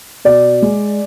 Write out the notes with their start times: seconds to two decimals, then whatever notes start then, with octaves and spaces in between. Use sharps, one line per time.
0.25 B2 D5
0.62 G#3